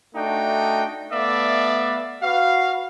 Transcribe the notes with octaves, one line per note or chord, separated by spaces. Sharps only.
A3 D4 D#4 F#4 G5
A3 B3 D5 E5 F5
F#4 B4 F5